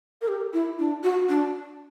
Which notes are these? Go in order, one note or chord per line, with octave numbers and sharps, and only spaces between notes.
A#4
G4
E4
D4
F#4
D4